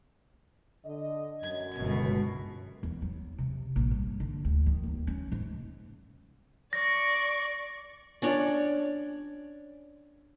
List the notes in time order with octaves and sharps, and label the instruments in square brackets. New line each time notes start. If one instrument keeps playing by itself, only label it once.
[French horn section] D3 D#5
[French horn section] F#2 [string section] G#6
[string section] G1 C#2 B2
[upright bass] E2
F#3
C3
A#1
G2
D3
D2
D#3
D#2
C#4
G#2
[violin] D5 C#6 [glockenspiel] A#6
[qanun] C#4 D4 C#5 D5